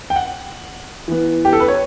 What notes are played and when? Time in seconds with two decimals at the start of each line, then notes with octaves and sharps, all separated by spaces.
0.10 G5
0.16 F#5
1.08 E3 B3
1.45 G4
1.53 A4
1.60 B4
1.68 C#5